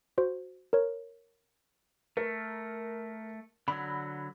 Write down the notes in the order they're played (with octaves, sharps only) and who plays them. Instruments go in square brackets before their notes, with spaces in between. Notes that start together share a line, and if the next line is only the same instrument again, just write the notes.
[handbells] F#4 C5
A#4 C#5
[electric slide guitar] A3 [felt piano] A#4
[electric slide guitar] D3 F#3 [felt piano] B5